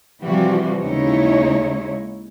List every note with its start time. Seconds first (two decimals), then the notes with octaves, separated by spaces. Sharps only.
0.22 C3 E3 F3 G3 F#4 G4
0.80 D#2 C#3 G#3 D#4 E4 C#5